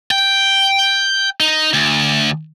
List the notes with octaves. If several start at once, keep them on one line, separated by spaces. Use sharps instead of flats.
G5
D#4
D2